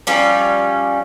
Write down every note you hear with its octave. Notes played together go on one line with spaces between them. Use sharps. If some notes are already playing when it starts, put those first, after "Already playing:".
F3 G3 C#4